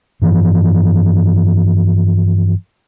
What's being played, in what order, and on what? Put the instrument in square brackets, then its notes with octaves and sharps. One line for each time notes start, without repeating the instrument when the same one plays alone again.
[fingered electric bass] G2 E3 F3